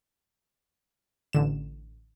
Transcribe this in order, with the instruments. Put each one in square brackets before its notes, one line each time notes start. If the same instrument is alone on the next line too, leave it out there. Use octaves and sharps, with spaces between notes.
[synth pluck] A1 D3 E7